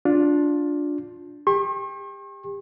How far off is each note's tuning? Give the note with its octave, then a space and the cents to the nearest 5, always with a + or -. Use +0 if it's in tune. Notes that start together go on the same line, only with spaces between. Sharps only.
D4 -5 F4 +20
G4 +30 C#6 -45